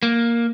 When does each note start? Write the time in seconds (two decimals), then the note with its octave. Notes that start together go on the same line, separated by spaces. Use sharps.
0.03 A#3